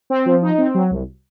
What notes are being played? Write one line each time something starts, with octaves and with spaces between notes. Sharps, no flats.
C4
F3
D#4
C4
F#3
C2